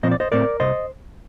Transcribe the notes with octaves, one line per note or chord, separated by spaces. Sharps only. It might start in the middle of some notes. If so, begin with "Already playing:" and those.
A#2 F3 C4 D#5
D5
C5 D#5
A2 A3 C4 A#4 D5
C2 C3 C5 D#5